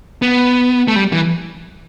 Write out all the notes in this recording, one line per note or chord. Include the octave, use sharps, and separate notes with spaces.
B3
A3
G3
E3